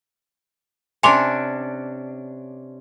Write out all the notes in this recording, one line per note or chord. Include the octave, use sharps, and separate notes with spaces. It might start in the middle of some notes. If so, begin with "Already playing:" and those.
C3 C#4 D4 G#5 C6 D6